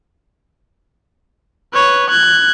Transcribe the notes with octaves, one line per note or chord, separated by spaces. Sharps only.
B4 C#5
F#6 G#6